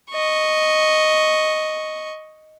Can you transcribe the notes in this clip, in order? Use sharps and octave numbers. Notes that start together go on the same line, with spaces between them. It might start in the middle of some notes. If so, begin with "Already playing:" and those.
D#5 C#6